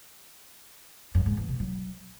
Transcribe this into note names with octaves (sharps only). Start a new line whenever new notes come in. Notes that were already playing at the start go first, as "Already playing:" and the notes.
F#2
G#2
E3
B2
F#3